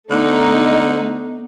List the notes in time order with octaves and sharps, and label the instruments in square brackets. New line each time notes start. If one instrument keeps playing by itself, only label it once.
[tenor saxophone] D3 [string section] A3 D#4 [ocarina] B3